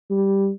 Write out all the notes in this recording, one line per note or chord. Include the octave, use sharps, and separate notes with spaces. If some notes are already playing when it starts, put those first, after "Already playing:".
G3